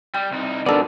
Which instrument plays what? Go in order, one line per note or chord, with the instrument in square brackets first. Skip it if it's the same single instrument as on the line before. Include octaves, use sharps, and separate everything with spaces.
[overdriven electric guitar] G3 [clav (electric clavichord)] G5
[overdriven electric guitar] C2 D#4
[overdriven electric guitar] G#2 B2 [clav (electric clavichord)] B3 A4 [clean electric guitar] D4 A#4 D5